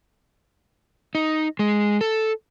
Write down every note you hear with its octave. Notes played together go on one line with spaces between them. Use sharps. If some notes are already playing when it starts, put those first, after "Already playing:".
D#4
G#3
A4